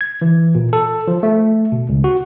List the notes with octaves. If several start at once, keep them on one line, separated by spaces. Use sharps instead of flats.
G#6
E3
A#2
A4
F3
A3
B2
C#2
F#4